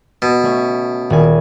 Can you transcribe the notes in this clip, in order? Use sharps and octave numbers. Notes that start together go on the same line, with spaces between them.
B2
A3 C#4
D#1 G#5